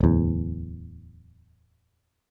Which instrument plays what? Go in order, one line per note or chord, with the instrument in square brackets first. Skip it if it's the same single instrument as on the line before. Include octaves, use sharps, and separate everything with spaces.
[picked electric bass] D1 E2